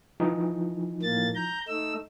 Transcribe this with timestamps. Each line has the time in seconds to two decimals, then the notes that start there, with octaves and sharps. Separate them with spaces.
0.20 E3 F3 D#4
1.03 A2 A#3 A6
1.35 A#5 G6
1.68 A3 D#4 E6